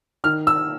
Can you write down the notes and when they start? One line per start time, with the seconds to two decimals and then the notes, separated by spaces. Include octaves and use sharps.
0.24 D#3 F6
0.47 E6